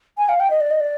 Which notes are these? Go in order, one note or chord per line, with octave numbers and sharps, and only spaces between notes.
G#5
F5
G5
D#5
D5
D#5
D5